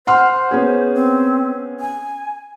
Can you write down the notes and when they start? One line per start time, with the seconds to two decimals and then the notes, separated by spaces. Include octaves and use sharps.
0.07 C5 F#5 C6 F6
0.51 B3 C#4 G#4
0.95 C4
1.80 G#5